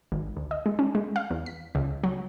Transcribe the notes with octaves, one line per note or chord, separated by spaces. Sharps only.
G#1
D2
D#5
G#3
C#4
G#3
F5
E2
B6
C#2
F#3